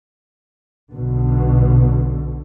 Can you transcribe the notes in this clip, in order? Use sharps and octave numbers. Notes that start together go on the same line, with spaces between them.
B1 B2 D3